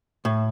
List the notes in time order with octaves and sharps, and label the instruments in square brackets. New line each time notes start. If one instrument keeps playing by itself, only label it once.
[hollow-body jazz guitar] A2